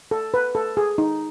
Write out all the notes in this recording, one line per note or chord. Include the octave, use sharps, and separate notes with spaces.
A4
B4
A4
G#4
D#4